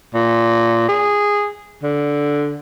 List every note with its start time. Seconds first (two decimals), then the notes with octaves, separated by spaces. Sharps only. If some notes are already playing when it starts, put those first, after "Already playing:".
0.14 A#2
0.88 G#4
1.84 D3